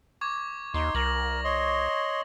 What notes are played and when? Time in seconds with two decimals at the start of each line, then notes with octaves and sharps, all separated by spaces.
0.21 C#6 D6 G#6
0.74 D#2 D#4 C6
0.95 C2 A#4 A#6 F#7
1.45 C#5 D#5 C6